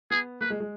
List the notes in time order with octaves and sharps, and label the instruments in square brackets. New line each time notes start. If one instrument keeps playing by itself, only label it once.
[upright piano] B3 [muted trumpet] G#4
[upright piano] A#3 [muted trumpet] B4
[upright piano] G#3
G#3